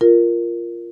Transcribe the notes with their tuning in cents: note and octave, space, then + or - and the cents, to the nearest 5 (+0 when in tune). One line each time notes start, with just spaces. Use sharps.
F4 -10 A#4 +0